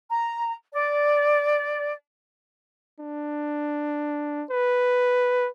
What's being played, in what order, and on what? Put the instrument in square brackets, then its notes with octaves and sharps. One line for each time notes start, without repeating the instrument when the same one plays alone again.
[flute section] A#5
D5
[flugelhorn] D4
B4